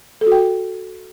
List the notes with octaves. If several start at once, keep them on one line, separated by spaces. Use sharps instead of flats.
A4
F#4
G5